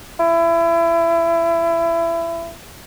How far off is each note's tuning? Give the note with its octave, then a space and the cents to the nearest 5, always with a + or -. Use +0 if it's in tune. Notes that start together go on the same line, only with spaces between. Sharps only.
E4 +25